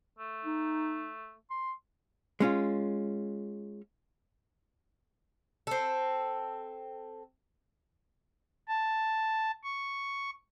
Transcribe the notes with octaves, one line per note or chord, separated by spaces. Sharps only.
A3
D#4
C6
G#3 C#4 F4
C4 A4
A5
C#6